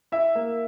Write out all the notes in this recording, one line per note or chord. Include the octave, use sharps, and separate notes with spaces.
E4 E5
A#3